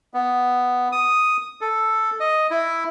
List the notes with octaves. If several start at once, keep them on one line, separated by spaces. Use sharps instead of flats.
B3
D#6
A4
D#5
E4